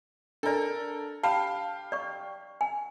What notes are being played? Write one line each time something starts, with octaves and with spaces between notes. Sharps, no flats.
D4 A4 A#4 D5
G4 F5 A5 B5
D5 C#6
G#5